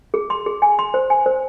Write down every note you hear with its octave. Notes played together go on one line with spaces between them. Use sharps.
G#4
C6
G#4
G#5
C6
C5
G#5
C5